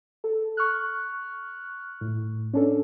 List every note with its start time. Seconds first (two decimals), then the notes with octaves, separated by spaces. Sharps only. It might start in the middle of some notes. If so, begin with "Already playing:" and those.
0.24 A4
0.57 C#6 F6 F#6
2.01 A2
2.53 C#4 D4 A4